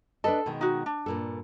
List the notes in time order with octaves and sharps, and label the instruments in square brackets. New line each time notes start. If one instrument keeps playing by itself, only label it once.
[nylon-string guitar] D4 B4 D#5 [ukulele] A4
[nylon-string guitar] B2 D#3 G#3
[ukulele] D#4 F#4
D4
[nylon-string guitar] G2 A#2 A4